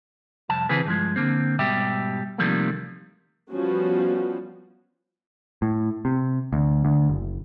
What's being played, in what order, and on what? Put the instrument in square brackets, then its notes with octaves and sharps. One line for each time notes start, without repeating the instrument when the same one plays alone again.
[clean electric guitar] C2 F2 A5
C#3 E3 C4 G#4 B4
G2 F3 G#3
D3 A#3 C4
G#2 B2 G3 G4 E5
C3 D#3 F3 G3 A3 A#3
[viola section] F3 G3 B3 C#4 F#4
[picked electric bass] A2
C3
D2
D2
F#1